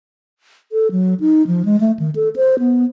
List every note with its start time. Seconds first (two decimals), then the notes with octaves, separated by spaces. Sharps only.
0.72 A4
0.91 F#3
1.20 D#4
1.47 F3
1.65 G#3
1.80 A3
1.99 D#3
2.16 A4
2.36 C5
2.59 B3